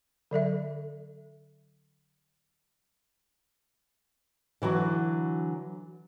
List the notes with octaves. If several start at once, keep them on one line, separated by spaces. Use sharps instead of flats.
D3 F#3 A4 E5
D3 E3 F#3 F#4